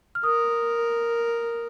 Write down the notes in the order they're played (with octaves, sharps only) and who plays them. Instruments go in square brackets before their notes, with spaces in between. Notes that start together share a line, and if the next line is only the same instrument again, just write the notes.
[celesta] F6
[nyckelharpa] A#4 [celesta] D#6